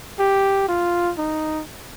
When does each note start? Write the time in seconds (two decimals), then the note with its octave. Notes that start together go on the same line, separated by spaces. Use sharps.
0.19 G4
0.68 F4
1.18 D#4